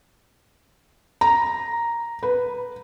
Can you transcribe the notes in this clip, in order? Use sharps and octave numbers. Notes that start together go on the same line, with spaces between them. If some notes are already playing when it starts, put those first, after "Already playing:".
A#5
B4